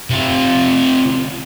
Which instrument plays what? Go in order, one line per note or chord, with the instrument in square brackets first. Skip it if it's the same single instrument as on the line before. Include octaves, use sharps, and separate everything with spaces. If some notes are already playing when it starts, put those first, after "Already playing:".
[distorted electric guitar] C3 F4